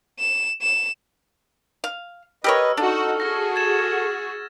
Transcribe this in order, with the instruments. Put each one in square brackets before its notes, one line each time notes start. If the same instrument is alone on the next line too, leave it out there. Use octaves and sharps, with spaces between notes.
[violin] E7
E7
[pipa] F5
[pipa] G4 A#4 C#5 [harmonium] B4 D#5 [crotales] E6 F6
[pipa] D4 [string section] D#4 F#4 F#5 [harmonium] A4
[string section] F#4 G#4 [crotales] F6 A#6
[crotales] G#6 A6 E7